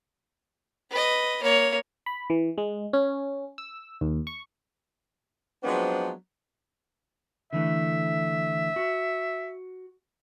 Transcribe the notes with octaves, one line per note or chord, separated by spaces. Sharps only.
B4 D#5
A#3 C#5
B5
E3
G#3
C#4
E6
D#2
C#6
F3 F#3 G#3 B3 C4 D4
D3 E3 A3 E5
F#4